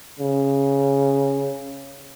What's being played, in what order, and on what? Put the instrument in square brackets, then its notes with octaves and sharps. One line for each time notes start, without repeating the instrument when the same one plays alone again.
[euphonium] C#3